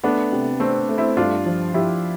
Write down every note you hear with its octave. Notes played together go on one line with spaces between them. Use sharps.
A3 B3 D4
C3
A3 C4 D4
A3
C4 E4
G2 D4 F4
F3
F3 E4 G4